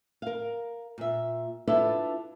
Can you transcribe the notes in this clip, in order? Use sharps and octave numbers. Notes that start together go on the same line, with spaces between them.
A#4 F5
A#2 E5
D4 E4 F4 A4 B4 E5